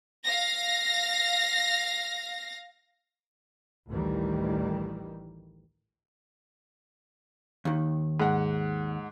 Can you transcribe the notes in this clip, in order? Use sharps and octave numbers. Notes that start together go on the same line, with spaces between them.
F5 A#6
A1 D2 D#3 E3 G3
D#2 D#3
G#2 F#5